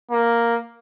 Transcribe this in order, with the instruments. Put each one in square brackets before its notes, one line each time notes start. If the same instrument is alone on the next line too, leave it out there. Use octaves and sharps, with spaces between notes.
[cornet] A#3